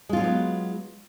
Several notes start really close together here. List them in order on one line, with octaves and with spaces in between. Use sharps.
G#3 F4 F#3 D4 B3